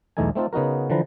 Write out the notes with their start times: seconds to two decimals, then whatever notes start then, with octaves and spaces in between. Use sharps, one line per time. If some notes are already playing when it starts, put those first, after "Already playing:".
0.17 B1 E2 A3 D#4 A4 G#5
0.35 A3 C4 D#4 F4 A4
0.53 C#3 B3 D#4 F#4 A#4
0.90 D3 E3 F3 B4 A#5